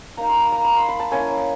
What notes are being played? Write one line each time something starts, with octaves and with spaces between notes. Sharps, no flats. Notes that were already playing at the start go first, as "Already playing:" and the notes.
A#3 D#4 A#5
C6
B5
A#5
B5
C6
B5
A5
A#3 C#4 E4 G#5